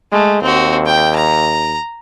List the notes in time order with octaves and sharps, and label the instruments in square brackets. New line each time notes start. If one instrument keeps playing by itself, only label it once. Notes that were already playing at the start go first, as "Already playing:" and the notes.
[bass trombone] G#3 [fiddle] A3
[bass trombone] D#2 [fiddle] C4 F#4
[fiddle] G5
A#5